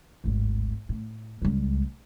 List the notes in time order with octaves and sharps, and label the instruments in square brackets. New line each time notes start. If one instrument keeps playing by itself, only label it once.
[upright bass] D1 G#1
A2
C#2 G3